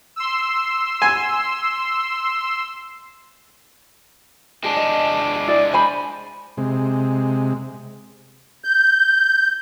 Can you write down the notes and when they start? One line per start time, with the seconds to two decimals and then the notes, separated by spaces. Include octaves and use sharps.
0.16 C6 E6
1.02 G#5
4.64 G#3 D4 G#4
4.77 D#5
5.47 E4 G#4 D5
5.73 C5 G#5 B5
6.57 C3 G#3
8.64 G6